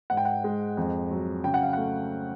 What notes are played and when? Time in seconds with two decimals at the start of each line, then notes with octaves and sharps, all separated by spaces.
0.10 G#2 F#5
0.17 G5
0.25 F#5
0.44 G#3
0.77 F2
1.11 F#3
1.44 C#3 G5
1.54 F#5
1.63 F5
1.73 A3 F#5